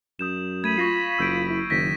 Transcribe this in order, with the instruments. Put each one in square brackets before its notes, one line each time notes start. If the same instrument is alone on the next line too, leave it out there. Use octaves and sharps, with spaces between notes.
[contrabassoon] F#2 [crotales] D#6 G6 E7
[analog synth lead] A3 [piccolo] B5 [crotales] G#6 D#7
[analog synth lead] F4 [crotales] C#6 A#6 C7
[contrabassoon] F#1 [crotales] E6 G6 D7
[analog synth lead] E4
[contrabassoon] F#1 [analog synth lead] D#3 [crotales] A#6 [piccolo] B6